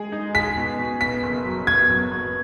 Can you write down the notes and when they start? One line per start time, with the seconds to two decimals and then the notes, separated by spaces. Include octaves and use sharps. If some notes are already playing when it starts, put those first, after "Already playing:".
Already playing: G#3 G#4
0.12 D#4
0.34 G#4 B6
0.57 B2
0.79 B2
1.01 B3 B6
1.23 F#1
1.45 F#3
1.67 B3 G#6
1.90 F#3
2.11 B3